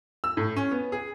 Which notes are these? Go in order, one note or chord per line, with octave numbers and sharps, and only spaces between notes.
E6
A2
C#4
B3
G#4